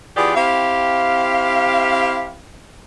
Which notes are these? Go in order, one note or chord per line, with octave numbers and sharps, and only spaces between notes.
E3 B3 F4 G4 G#4 D5
C4 E4 G4 F5